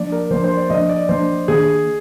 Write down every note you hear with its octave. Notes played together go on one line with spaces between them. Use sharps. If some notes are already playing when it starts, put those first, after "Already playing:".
Already playing: F3 A#3 D4 D5
A#4
F3 A#3 D4 C5
C5
D5
F3 A#3 D4 D#5
D5
F3 A#3 D4 C5
D#3 A#3 D4 G#4